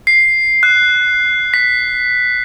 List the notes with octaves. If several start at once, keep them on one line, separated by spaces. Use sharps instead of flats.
C7
F#6
B6